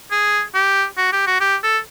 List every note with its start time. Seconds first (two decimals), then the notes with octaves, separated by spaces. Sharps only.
0.11 G#4
0.54 G4
0.97 F#4
1.13 G4
1.27 F#4
1.41 G4
1.63 A4